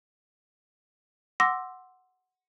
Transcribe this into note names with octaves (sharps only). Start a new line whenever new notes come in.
F#5 C6 D6 E6 A#6